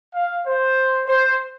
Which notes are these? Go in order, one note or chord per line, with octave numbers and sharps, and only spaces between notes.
F5
C5
C5